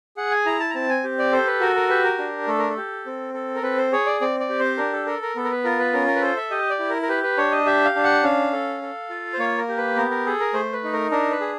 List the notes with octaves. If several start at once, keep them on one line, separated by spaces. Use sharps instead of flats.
G#4 F#5
G#5
E4 A#5
A5
A#5
C4 A5
G#5
G4
D5
A4 C5
B4
F#4 A#4
A#4
G4 B4
A#4
D4
A3 A4
A#4
A4
G4
C4
A4
A#4
C4 B4
C5
G#4 C#5
D5
C4 D5
D5
G4
C5
D4 A#4
A4
A4 A#4
A#4
B3 A4
A#4
B4
F4 A#4
B4
C#4 A#4
A#4
B4
A4 C5
E5
G4 D#5
D5
E4
A#4
A#4
G4 B4
B4
D4 C#5
D#5
G4 E5
F5
D4
F#5
C#4 F5
A4
A4
F4
C5
A#3 C#5
A#4
G4
B4
B3 A#4
A#4
G#4 A4
A#4
A3 C5
B4
D#4
A#4
D4 A#4
B4
G#4